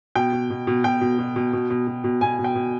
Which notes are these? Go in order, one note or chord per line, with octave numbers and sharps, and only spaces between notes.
B2 G5
B2
B2
B2
B2 G5
B2
B2
B2
B2
B2
B2
B2
B2 G#5
B2
G5
B2